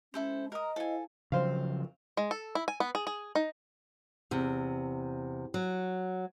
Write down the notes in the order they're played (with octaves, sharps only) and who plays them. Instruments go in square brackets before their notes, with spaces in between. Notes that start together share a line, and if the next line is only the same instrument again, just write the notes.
[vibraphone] G#3 [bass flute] C#4 [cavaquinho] E4 A4 C5
[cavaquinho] A#4 D#6 [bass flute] D#5 [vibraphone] A#5
[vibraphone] E4 C5 F5 [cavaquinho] A4 G#5
[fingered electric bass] C#3 F3 F#3 [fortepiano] C4 C5 F5
[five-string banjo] G#3
A4
E4
G#5
B3
G#4
G#4
D#4
[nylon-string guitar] E2 C3
F#3